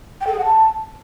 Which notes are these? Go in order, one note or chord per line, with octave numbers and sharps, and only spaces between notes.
G5
A4
G#4
F#5
A5